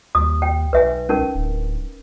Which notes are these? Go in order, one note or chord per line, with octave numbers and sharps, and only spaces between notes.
D#2 D#6
G5
B1 B4 E5 G#5
C#4 D#4 A#4
D1